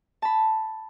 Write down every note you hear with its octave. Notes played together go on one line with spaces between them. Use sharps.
A5 B5